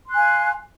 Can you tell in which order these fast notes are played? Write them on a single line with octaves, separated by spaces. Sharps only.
C6 F#6 G#5 F5